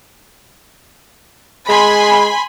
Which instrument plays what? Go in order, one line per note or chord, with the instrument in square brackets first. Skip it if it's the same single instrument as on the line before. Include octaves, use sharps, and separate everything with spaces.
[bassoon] G#3 [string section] G#5 B5 C6